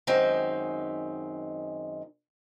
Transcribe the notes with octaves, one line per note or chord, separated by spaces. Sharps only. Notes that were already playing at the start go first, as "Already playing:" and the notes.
F#2 D#3 G#3 C4 D#4 E5